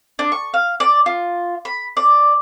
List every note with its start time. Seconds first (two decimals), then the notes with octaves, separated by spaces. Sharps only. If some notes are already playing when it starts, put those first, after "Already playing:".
0.19 D4
0.32 C#6
0.54 F5
0.80 D5
1.06 F4
1.65 B5
1.97 D5